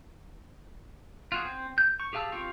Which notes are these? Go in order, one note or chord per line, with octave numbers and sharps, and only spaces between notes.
F4 F#4 G#4
C4
G6
C#6
G4 G#4 F5 A5 E6
C4 F4 G4 F5 C#6